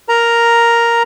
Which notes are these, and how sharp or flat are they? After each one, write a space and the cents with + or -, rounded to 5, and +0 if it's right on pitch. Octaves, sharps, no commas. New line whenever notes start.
A#4 +0 A#5 +0